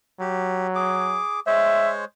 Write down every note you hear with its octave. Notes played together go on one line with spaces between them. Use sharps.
F#3 G4
G#4 D6
G#3 C5 C#5 E5